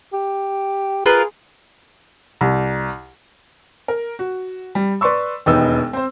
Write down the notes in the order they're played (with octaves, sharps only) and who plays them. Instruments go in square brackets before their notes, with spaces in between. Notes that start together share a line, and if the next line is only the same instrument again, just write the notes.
[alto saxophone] G4
[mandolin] F4 A#4 B4 [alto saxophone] G#4
[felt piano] C2
[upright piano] A#4
F#4
G3
B4 D5 C6 C#6 E6
E1 D#2 B3 D#4 E6
C4 C5